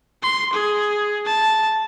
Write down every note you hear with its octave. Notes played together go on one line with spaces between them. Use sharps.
C6
G#4
A5